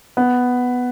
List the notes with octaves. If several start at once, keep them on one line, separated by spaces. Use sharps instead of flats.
B3